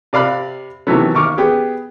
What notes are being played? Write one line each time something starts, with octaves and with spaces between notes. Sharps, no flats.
C3 D5 F5 B5 F#6
C3 D#3 E3 F#3 A3 B3
D#2 C#6 D6 F6
B3 G4 G#4